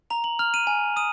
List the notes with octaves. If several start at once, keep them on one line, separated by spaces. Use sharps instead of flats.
A#5 F7
F#7
F6 F7
D#7
G#5
D#6 D#7